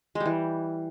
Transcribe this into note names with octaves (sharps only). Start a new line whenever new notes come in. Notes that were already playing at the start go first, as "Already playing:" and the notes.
G#3
G3
E3